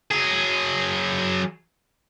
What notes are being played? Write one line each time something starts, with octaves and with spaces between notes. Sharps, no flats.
F#3 G#4